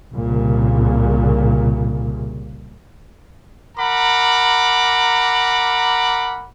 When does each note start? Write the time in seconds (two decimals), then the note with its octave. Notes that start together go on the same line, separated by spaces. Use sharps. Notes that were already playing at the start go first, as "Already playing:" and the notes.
0.12 C2 A#2 C#3
3.77 A#4 F#5 A#5 B5 D6